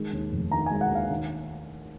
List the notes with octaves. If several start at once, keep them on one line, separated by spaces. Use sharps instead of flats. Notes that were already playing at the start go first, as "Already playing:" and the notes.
Already playing: D#3 G#3
D#2
F1
D#3 A#5
G#3 G#5
F#5
D#2 F5
D#2